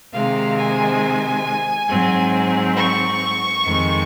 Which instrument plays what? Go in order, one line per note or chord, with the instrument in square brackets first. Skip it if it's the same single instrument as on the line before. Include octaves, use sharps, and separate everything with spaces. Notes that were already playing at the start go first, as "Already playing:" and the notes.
[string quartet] C3 D#3 G#3 C4 F5
G#5
G#2 F#3 C4
C#6
F2 D#3 G#3 C4